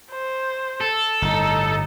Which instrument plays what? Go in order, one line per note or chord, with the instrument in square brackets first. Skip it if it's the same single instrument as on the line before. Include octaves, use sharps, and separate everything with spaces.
[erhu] C5
[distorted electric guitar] A4
[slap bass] G1 A2 [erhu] D#4